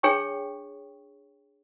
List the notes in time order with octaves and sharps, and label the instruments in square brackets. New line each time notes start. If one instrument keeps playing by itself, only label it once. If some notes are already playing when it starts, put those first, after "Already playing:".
[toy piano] D4 G#4 C#5 G5 C#6